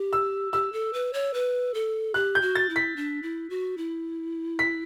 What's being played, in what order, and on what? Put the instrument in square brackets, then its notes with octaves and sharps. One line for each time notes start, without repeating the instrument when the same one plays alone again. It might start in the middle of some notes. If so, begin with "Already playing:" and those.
Already playing: [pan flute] G4
[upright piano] E6
[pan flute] G4 [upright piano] E6
[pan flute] A4
B4
C#5
B4
A4
[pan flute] G4 [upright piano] F#6
[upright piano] G6
[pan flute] F#4
[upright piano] A6
[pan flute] E4
[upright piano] B6
[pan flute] D4
E4
F#4
E4
[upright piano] B6